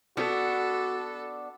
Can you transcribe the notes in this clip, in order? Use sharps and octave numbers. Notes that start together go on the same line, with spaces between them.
B3 D4 F#4 A4